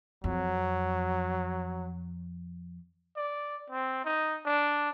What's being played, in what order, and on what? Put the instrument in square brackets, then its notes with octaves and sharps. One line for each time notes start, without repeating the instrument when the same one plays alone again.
[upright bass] F2 [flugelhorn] F#3
[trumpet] D5
C4
D#4
D4